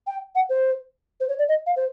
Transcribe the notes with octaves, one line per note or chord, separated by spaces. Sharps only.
G5
F#5
C5
C5
C#5
D5
D#5
F5
C5